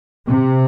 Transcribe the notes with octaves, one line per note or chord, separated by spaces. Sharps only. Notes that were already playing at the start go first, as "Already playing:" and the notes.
C3